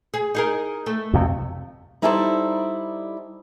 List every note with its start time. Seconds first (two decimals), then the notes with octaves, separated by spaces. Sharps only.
0.14 G#4
0.35 D#4 G#4 A#4
0.86 A3
1.14 F2 C3
2.02 G3 D#4 E4 A4 C5 D5